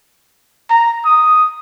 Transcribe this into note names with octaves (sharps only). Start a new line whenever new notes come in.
A#5
D#6